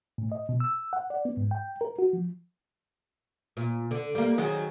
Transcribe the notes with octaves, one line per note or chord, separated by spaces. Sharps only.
A2
D#5
B2
E6
F#5
D5
B3
G#2
G5
A#4
F#4
F3
A#2
D3
G3 A#3
D#3 F#3 G#3